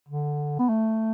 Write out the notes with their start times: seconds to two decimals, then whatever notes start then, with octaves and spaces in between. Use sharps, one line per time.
0.09 D3
0.59 B3
0.69 A3